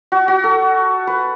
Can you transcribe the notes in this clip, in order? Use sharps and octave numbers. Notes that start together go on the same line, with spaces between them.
F#4
F#4
A4
B4